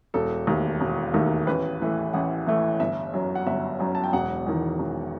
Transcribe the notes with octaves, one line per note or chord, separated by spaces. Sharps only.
E1 A4
D#2 D#3 A3
E1
D#2 D#3 A3
A1 B4
A2 E3 A3
A1 F#5
A2 E3 A3
G1 E5
F#2 F#3
F#5
G1 E5
F#2 F#3
A5
G5
E1 F#5
E2 D#3
E1